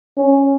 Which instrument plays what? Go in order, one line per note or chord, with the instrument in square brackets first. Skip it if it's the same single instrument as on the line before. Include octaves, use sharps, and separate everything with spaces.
[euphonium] C#4